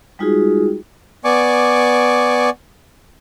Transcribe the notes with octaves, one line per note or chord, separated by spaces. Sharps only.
G3 G#3 D#4 F4 F#4 G#4
B3 D5 G#5 C#6 D6